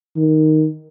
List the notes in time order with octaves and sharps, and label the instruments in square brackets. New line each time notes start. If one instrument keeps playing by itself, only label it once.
[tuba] D#3